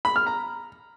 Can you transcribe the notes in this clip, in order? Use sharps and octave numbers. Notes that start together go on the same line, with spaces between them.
B5
F6
A#5